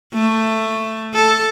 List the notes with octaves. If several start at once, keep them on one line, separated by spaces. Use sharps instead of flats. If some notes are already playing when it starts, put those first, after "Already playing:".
A3
A4